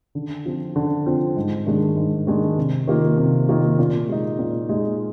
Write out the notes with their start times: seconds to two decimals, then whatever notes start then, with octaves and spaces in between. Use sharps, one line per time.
0.15 D3
0.45 F3 C4 F4
0.76 D3
1.06 F3 C4 F4
1.36 G#2
1.66 D#3 G#3 D4
1.96 G#2
2.27 D#3 G#3 D4
2.57 C3
2.87 D#3 A#3 F4
3.18 C3
3.48 D#3 A#3 F4
3.79 A#2
4.09 G#3 D#4
4.39 A#2
4.69 G#3 D#4